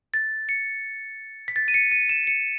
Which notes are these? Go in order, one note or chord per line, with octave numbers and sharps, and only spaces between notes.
A6
C#7
B6
A6
D#7
C#7
D#7
E7
C#7